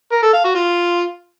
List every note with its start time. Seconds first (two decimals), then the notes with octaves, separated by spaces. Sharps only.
0.12 A#4
0.23 A4
0.33 F5
0.44 F#4
0.55 F4